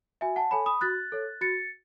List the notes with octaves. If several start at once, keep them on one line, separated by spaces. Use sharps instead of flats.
F#4 E5 G#5
F#5 A5
A4 C#5 G#5 B5
B5 D#6
F#4 F#6 A6
A4 C#5
F#4 A6 C#7